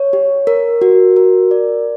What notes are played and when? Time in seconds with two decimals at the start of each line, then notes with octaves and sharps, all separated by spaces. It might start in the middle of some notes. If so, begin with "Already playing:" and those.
Already playing: C#5
0.13 G4
0.47 A#4
0.82 F#4
1.16 A#4
1.51 D5